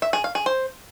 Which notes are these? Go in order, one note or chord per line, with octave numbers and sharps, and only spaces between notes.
E5
G#4
F5
G#4
C5